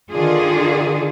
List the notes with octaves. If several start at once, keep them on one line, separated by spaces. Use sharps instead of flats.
D3 D#3 D4 F4 G#4